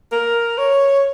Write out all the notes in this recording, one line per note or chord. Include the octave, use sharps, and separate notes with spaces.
A#4
C#5